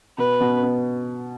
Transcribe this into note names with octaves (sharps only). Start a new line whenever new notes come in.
B2 B4
B2
B3